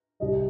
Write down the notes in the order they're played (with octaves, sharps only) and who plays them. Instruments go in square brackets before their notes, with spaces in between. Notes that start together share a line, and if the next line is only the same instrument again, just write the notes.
[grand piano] C2 C3 G3 D#5